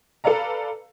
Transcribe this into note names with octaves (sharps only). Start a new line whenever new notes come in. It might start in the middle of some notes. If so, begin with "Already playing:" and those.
A4 B4 D5 F5 A#5